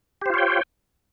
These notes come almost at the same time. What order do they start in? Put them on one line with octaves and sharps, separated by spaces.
G4 C5 F4 C#5 G5